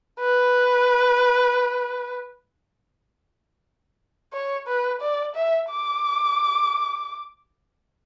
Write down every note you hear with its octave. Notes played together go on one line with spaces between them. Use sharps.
B4
C#5
B4
D5
E5
D6